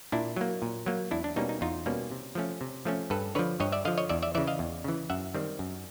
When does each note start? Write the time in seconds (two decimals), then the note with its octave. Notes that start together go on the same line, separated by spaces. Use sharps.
0.12 A#2 D4 E4
0.36 F#3 A#3
0.62 A#2
0.86 F#3 A#3
1.11 E2 D4 E4
1.24 D4
1.36 B2 G3 A#3 C#4 D#4
1.49 D#4
1.61 E2 D#4 F4
1.86 B2 G3 A#3 C#4
2.11 C3
2.35 F3 A3 C#4
2.61 C3
2.85 F3 A3 C#4
3.10 G2 A4 B4
3.35 D3 F3 B4 C#5
3.60 G2 C#5 D#5
3.72 D5 E5
3.85 D3 F3 D#5 F5
3.98 C#5 D#5
4.09 E2 D5 E5
4.23 D5 E5
4.35 C#3 E3 D5 E5
4.47 D#5 F5
4.59 E2
4.84 C#3 E3
5.10 F#2 E5 F#5
5.35 D#3 G3 C4
5.59 F#2